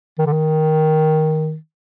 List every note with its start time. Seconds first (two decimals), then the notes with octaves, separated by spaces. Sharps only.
0.18 D#3
0.26 D3
0.32 D#3